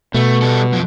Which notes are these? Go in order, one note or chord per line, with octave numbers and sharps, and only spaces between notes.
B2 A3
G3 A4
F#2 F3